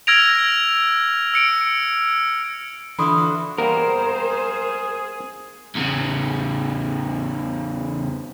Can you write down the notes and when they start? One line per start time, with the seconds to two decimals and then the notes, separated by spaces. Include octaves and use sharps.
0.07 E6 F6 G#6 A#6 D7 F7
1.34 E6 C#7 D7
2.98 D3 E3 E4 F4 B5 C6 D#6
3.18 F#4
3.58 G3 A#3 B3 G#4 A#4 C5
5.75 E2 C#3